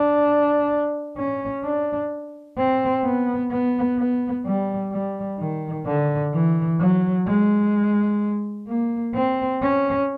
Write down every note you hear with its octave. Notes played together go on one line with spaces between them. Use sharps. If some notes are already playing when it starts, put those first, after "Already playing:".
Already playing: D4
C#4
D4
C4
B3
B3
B3
G3
G3
D#3
D3
E3
F#3
G#3
A#3
C4
C#4